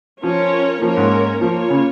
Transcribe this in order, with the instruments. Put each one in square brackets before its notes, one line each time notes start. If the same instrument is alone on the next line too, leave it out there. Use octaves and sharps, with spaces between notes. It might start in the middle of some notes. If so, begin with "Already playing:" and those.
[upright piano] F3 [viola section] C#4 F4 A#4 C#5
[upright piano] F3 [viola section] A#3 C#4 A#4 C#5
[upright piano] G#2
[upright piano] F3 [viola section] A#3 F4 C#5
[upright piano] C#3